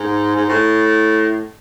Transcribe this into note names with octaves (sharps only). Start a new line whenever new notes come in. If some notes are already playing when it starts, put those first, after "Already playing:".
Already playing: G#2
G#2
A2